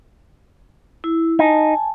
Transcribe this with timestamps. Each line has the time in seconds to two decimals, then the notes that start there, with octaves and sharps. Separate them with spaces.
1.04 E4
1.39 D#4 G#5 A5